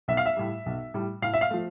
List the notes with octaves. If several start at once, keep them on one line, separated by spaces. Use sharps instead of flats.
B1 E5
F5
E5
A2 G3
B1
A2 G3
A2 F5
E5
F5
F3 A3